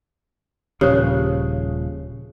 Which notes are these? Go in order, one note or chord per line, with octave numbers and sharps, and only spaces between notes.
D#1 A#2 C#3 F3 G4 C5 C#5